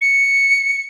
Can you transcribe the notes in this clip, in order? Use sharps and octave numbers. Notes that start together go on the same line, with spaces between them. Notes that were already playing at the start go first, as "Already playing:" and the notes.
C#7